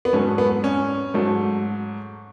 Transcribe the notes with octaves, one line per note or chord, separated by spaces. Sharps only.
B3
G#2 F#3 A3 C#4
B3
C#4
G#2 F#3 A3